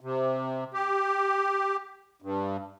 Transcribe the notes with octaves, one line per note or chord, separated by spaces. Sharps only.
C3
G4
G2